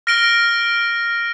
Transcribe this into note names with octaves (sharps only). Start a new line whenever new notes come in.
F6 A#6 D7 G7